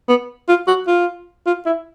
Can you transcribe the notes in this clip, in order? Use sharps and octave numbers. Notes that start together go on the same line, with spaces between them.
B3
F4
F#4
F4
F4
E4